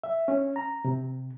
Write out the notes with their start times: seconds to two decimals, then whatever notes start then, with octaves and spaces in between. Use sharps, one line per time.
0.04 E5
0.28 C#4
0.56 A#5
0.85 C3